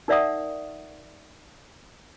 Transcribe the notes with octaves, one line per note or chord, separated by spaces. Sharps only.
D#4 A#4 D5 E5 F#5 D#6